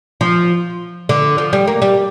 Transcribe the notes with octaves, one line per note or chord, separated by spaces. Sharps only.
F3
D3
F3
G3
A#3
G3